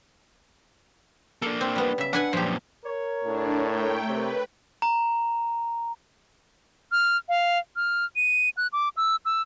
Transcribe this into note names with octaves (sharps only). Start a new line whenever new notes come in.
A#3 D4 A4
C4
G3 B3
C#3 E5
D4 B4 F#5 G#5
F#2 A#2 F3 G4
A#4 C#5
A2 D4
A3 G5
C3 B4
A#5
F6
F5
F6
D#7
F#6
D6
E6
E6